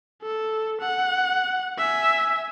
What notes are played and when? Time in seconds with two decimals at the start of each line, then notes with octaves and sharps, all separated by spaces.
0.22 A4
0.81 F#5
1.78 E5 G#5